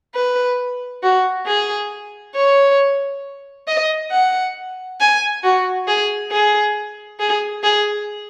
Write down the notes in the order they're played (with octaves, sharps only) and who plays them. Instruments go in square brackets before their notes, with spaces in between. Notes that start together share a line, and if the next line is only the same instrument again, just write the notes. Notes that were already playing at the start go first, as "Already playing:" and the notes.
[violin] B4
F#4
G#4
C#5
D#5
F#5
G#5
F#4
G#4
G#4
G#4
G#4